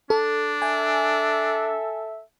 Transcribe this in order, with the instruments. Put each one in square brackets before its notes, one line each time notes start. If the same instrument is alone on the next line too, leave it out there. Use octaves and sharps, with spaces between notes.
[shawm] D4 [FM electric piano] A4
[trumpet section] A4 E5 [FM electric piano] G#5